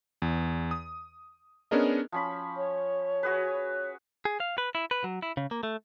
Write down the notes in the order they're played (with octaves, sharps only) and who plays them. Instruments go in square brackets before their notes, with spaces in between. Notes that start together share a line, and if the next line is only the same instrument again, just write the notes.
[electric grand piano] E2
D#6
B3 C#4 D4 G#4 A#4 D#5
[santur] F3 C#4 B5
[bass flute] C#5
[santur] F#4 G#4 B4
[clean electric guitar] G#4
F5
B4
E4
B4
F#3
E4
C#3
A#3
A3